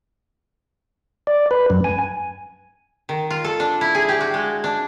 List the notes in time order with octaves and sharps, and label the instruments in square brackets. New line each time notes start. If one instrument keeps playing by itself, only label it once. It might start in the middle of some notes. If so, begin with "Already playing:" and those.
[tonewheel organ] D5
B4
F#2
G#5
[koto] D#3
F4
A4
D4
E4
G#4
G4
F#4
G#3
D4